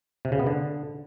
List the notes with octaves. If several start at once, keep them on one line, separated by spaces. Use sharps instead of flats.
C3
C#3
B3
D3